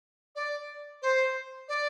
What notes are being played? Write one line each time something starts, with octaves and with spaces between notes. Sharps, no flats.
D5
C5
D5